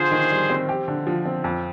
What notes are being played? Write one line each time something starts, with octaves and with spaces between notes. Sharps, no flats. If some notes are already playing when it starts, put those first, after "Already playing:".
Already playing: D3 F4 G#4 C5
D#3
G3
C4
G4
D3
F3
C4
F2